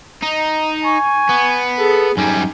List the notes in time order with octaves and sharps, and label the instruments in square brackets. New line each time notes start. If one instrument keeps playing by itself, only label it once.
[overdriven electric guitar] D#4
[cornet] G#5 [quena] C#6
[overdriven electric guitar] B3
[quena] G#4 [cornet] A4
[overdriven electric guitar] F#2 G3 [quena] D#4 [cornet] G#5